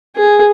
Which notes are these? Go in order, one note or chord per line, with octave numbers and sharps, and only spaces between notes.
G#4